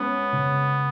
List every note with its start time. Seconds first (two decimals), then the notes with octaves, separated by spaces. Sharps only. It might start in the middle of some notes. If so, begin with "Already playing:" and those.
Already playing: G#3 B3 C#4
0.32 C#3